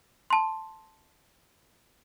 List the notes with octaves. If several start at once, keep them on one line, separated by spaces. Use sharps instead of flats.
A5 C6